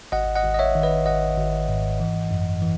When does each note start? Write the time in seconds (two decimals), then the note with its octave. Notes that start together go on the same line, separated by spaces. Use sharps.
0.12 G#1 D#5 F#5
0.36 D#5 F#5
0.44 G#1
0.54 D#5
0.59 C#5 E5
0.75 D#3
0.83 B4 D#5
1.06 G#1 D#5 F#5
1.38 G#1
1.69 G#2
2.00 E3
2.31 F#2
2.62 E3